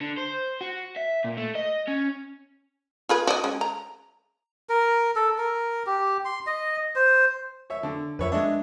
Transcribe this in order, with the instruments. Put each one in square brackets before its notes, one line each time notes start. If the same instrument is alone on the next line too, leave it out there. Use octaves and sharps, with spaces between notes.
[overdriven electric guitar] D3
C5
F#4
E5
A#2
A3
D#5
C#4
[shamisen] F4 G#4 B4
F#4 D5 D#5
G#3 C#4
A#5
[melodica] A#4
A4
A#4
G4
C6
D#5
C5
[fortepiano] C#5 E5
D3
[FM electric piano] F2 F3 [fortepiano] B4 C#5 E5
[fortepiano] G#3 D4 [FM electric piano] D#5 E5